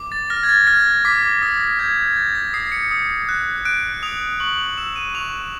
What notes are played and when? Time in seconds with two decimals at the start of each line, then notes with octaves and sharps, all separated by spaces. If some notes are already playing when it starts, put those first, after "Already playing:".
Already playing: D6
0.12 A6
0.30 F6 A#6
0.43 G#6
0.49 A6
0.67 F6 A#6
1.05 D6 B6
1.42 D#6 A#6
1.79 G6 G#6
2.08 G#6
2.16 G6 A6
2.35 A#6
2.53 D#6 C7
2.72 C#7
2.91 D#6
3.29 F#6
3.65 F#6 D7
4.03 D#6 F7
4.40 C#6 F#7
4.58 F7
4.78 E6 E7
4.96 D#7
5.15 C#6 F7